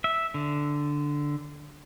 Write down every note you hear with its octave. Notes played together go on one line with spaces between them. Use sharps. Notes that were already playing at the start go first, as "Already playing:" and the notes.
E5
D3